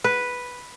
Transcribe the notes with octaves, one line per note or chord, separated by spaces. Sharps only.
B4